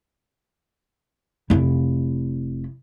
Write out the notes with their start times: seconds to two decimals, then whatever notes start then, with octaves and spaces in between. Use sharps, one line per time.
1.50 F1 E4